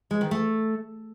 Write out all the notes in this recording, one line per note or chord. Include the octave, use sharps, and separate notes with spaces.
G#3
D#3
A3